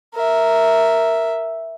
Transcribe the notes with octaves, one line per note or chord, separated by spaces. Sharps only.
A#4 E5